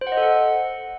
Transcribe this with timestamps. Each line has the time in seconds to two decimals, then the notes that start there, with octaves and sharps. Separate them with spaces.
0.01 C5
0.07 F#5
0.12 D#5
0.17 A4
0.22 F#5